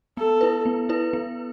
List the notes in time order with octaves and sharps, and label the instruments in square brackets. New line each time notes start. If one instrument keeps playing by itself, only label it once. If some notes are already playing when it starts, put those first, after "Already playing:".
[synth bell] B3 [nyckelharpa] A4
[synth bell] E4 B4
B3
E4 B4
B3